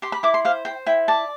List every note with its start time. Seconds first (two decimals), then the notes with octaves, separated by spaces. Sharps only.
0.02 G4 C6
0.12 B5
0.23 E4 D6
0.34 C6
0.45 C5 F5
0.65 C5 G5
0.86 E4 G5
1.08 D5 A5